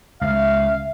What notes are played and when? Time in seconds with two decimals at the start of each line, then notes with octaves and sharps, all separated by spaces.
0.21 C#2 E5 F5